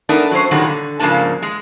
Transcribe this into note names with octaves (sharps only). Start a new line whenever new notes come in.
A3 B3 D4 D#4 A#4
F#3 C#4 C5
A#2 D3 D#3 F#3 G3 F#4
D3
G#2 C#3 F3 A#3 D4 A5
G#3